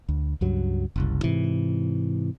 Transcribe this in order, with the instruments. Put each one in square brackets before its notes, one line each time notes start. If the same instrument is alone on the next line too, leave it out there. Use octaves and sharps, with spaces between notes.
[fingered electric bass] D2
C#2 G2 F#3
F#1 C2
G#2 C3 E3